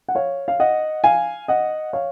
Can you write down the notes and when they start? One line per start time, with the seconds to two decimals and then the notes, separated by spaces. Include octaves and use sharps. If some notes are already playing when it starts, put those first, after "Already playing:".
0.09 F#5
0.15 C#5 F5
0.48 F5
0.60 D#5 F#5
1.04 F5 G#5
1.48 D#5 F#5
1.93 C#5 F5